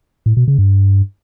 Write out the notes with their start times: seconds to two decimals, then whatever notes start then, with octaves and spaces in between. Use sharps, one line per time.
0.26 A2
0.37 B2
0.48 C#3
0.58 G2